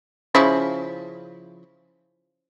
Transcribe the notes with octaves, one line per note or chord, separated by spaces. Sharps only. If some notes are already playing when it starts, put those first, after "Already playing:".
C#3 F3 E4